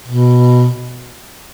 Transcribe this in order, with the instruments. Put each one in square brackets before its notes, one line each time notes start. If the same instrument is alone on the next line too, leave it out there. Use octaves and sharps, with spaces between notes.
[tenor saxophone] B2